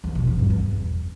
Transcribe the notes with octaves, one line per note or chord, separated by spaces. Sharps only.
E2
B2
E2
G2
E2